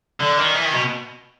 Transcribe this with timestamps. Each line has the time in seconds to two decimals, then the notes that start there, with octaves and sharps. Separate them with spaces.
0.21 D3
0.38 D#3
0.55 E3
0.65 D#3
0.74 B2